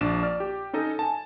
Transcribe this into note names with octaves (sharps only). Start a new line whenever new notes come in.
A#1 D4 D5 E7
D5 F6
G4
C#4 D#4 A4 D#5
G#5 A5